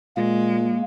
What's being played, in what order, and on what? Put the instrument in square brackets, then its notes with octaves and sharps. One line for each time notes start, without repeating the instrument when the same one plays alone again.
[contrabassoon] A#2 [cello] G#3 [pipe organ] A#3